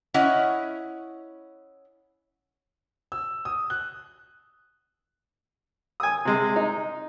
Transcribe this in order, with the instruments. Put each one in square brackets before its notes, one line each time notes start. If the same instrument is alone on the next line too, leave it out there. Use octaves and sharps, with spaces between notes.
[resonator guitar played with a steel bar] C#4 E4 D#5 F#5
[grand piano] E6
D#6
F#6
[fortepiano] G#5 D#6
C3 G#3
D#4